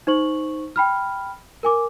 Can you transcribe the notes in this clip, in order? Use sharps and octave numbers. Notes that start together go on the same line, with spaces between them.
D#4 C5 C#6 F#7
G5 B5 F6
A#4 G#5 D6